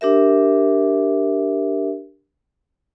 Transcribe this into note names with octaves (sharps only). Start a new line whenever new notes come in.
D4 G4 A#4 E5